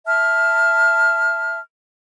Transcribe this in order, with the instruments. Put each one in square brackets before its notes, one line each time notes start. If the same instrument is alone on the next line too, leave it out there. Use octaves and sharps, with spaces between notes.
[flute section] E5 A5 F6